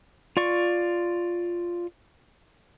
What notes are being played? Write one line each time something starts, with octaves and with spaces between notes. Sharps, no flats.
F4 D5 C#6